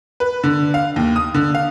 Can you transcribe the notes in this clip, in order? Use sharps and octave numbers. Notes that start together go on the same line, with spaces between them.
B4
D3
F5
D#2
D#6
D3
F5